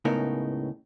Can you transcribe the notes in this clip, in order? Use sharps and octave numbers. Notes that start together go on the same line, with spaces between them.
C#2 A2 C#3 B3 D#4 A#4